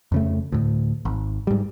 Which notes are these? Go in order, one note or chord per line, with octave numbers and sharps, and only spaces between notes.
F2 C#3 A3
D2 A2
G#1
G#2 G3